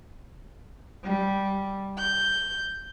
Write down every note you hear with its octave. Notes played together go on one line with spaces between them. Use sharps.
G3
G6